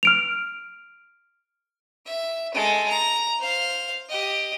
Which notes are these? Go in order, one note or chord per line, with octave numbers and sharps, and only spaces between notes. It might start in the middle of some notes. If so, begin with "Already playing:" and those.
F6 D7 F7
E5
G#3 A4
A#5
C5 F5
G4 D#5